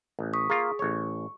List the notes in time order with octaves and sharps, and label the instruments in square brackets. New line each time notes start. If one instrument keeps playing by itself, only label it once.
[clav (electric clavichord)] A1
[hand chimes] C#6 D#6 B6
[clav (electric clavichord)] A#3 F4 [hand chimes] G#4
[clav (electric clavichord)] A1 C#5 [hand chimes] C#6